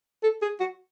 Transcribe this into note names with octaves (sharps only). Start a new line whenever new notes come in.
A4
G#4
F#4